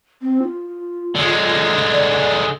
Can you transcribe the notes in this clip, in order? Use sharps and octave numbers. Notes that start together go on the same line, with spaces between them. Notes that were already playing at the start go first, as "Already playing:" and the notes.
C4
F4
D3 G#3
D5